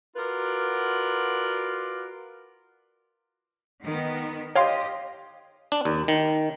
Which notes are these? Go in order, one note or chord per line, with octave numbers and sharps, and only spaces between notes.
F4 F#4 A#4 B4 D5
D#3 B3
G4 C#5 D#5 F5 G5 C6
D4
D#2
D#3